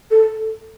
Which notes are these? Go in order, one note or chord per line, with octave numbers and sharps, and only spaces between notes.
A4